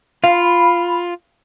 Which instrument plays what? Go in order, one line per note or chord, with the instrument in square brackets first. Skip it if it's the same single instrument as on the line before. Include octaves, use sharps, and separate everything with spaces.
[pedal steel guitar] F4 [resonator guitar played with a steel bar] F5 [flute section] B5